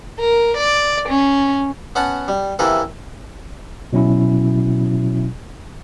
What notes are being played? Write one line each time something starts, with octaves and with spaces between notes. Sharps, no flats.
A#4
D5
C#4
B3 C#4 F#5 A5
G3
C3 E3 A#3 A4 B4
B2 F#3 C#4 E4